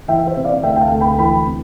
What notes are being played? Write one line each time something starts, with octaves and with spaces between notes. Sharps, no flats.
E3 E5 G5
C5 E5
C3
D5 F5
D2 E5 G5
G5
F5 A5
D2
G5 B5
E3 G5 B5
C3